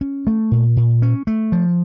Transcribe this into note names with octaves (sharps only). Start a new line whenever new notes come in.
C#4
A3
A#2
A#2
C#4
A3
F3